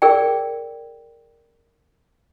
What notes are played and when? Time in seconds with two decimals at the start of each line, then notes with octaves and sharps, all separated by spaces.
0.02 G#4 A#4 D5 G5